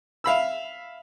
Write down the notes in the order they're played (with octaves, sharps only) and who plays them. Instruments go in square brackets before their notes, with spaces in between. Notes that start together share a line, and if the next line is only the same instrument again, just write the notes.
[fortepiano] E5 F5 B5 E6